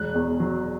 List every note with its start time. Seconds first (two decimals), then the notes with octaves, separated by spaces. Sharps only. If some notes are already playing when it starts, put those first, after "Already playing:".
Already playing: E1 F#6
0.14 E2
0.40 F#3